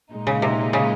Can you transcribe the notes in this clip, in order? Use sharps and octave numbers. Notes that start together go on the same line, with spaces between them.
A#2 G#3 D#4
C#3
C3
C#3